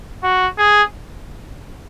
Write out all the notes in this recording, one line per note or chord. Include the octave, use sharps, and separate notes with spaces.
F#4
G#4